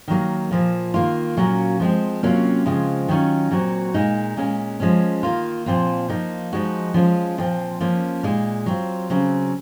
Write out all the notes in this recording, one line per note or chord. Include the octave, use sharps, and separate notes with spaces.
D#3 F#3 A#3
A#2 F3 A#3
D#3 A#3 F4
A#2 F#3 A#3 C#4 F#4
F3 G#3 C4
C3 F#3 A#3 C#4 F4
C#3 F3 G#3 C4 F4
D#3 F#3 C#4 F4
A#2 F#3 C4 F#4
A#2 G#3 D#4
A#2 G#3 C#4
F3 G#3 C#4
D#3 A#3 F4
A#2 F3 C4 F4
F3 A#3 D#4
F3 G#3 D#4 F#4
F3 G#3 C#4 F4
A#2 F3 C4
F3 A#3 C#4
A#2 G#3 D#4
F#3 C4 F4
C#3 F#3 C4